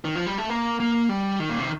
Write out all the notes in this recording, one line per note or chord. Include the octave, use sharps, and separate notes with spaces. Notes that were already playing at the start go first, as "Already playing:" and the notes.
D#3
F3
G3
A3
A#3
A#3
G3
D#3
A#2
C3